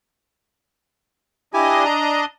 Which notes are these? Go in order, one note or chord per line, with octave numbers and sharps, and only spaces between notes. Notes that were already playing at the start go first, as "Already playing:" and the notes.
D4 E4 G4 D#5 G#5
A#5